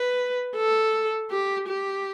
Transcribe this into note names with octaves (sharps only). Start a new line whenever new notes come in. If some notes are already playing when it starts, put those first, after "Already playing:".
Already playing: B4
A4
G4
G4